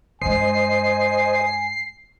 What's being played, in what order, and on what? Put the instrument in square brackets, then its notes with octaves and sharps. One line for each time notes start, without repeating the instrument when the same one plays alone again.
[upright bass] G2 G#3 [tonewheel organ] C5 D#5 [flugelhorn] G#5 [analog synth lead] C7